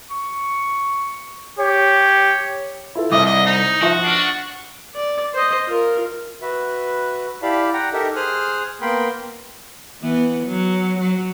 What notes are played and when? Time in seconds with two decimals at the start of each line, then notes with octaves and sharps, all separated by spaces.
0.10 C#6
1.59 G4 C#5
2.95 E4 F4 A4
3.12 C2 D#5 E5 D6 D#6
3.26 D#5
3.46 D#4
3.82 F3 F#4 E5
4.04 D4 F6 C7
4.95 D5
5.34 C5 D#5
5.67 F4 A#4
6.42 F#4 B4 E5
7.42 E4 G4 D5 F5 A5 B5
7.73 F#5 G5 A#5
7.93 D#4 G4 A4 A#4 E5
8.15 G#4 C5 G#5 D#6 F6 F#6
8.81 A#3 B3 A#4 G5 B5 C6
10.02 E3 B3
10.46 F#3
10.99 F#3